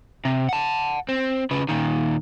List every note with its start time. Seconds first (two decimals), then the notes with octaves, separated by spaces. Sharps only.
0.25 C3
0.49 F#5 A5
1.09 C4
1.51 C#3 B4
1.69 A#2 D#3